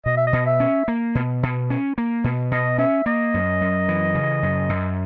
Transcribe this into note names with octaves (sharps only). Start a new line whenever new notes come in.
B2 D#5
E5
D#5
B2
E5
C#4
A#3
B2
B2
C#4
A#3
B2
B2 D#5
C#4 E5
A#3 D#5
F#2
F#2
E3
C#3
F#2
F#2